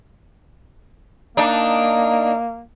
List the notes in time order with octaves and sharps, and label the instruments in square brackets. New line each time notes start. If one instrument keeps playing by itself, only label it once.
[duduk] A#3 [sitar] D4 D#4